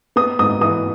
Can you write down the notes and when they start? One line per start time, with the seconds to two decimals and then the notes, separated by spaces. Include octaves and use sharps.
0.16 B3 D#6
0.39 G#2 D#6
0.61 E3 D#6